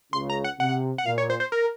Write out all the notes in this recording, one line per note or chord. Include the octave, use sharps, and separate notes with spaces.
C#2 C#3 C6
A#5
F#5
C3 F#5
F#5
A#2 F5
C#5
C5
C5
A#4